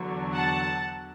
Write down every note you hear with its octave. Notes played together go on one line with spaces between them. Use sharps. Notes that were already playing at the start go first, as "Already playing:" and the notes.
Already playing: E2 D3 F#3
F#5 A5